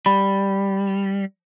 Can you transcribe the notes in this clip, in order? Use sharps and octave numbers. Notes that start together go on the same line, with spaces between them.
G3 B5